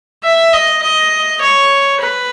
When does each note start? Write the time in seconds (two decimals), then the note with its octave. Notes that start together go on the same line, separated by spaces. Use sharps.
0.24 E5
0.53 D#5
0.83 D#5
1.41 C#5
2.01 B4